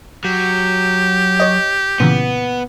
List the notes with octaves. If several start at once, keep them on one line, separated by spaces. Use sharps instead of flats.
F#3 G4
C#5 D#5
A#2 C#3 E3 B3